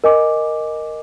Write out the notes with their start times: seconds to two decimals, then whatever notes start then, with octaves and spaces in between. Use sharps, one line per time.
0.04 A#4 D#5 G#5 D6